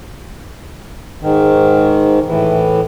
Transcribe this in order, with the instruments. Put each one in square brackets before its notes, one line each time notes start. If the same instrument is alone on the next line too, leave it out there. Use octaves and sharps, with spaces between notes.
[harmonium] G#2 D#3
A2 E3